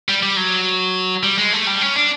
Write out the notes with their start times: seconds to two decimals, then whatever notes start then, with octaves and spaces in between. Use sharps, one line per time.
0.09 G3
0.23 G3
0.37 F#3
1.23 G3
1.37 G#3
1.53 A3
1.67 G3
1.81 C#4
1.96 D4